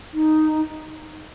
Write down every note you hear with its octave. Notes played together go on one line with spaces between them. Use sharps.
D#4